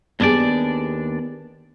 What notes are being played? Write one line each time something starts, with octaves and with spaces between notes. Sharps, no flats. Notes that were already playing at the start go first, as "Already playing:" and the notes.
D#2 B3 D4 G4 G#4 D5